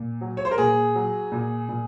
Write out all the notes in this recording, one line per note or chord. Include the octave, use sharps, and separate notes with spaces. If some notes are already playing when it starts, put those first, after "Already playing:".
Already playing: A#2
F#3
C#5
C5
A#4
A#2 G#4
F#3
A#2
A#2